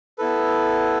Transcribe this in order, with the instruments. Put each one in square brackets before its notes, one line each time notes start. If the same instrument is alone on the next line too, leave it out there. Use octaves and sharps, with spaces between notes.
[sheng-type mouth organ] B3 E4 A4 B4